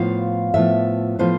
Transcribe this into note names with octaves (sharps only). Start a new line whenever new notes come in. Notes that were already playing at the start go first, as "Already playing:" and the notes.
Already playing: A2 F3 B3 F4 F5
A2 F3 B3 F4 E5
A2 F3 B3 F4 C5